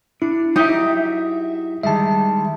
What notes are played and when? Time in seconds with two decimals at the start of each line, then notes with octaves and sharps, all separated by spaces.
0.22 D4 E4
0.56 F#3 D#4 G4 E5
1.83 D#3 G3 G#3 E5 A5